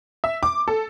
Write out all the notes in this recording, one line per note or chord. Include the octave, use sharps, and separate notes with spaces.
E5
D6
A4